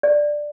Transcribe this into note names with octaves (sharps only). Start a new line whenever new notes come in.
D5